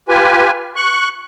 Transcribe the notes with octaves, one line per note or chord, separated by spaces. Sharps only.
F4 G4 B4 G#5
C#6 F#6